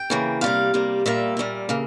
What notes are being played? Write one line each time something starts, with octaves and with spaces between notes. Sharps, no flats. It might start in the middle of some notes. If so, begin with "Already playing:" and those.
Already playing: G5
C#3 E3 A#3
C3 G3 A#3 F5
C3 G3 A#3
A#2 G3 A#3 E5
A#2 G3 A#3
C#3 E3 A#3